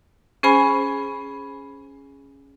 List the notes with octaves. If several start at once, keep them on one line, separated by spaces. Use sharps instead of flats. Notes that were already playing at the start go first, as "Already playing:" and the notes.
C#4 G#4 C5 G#5 B5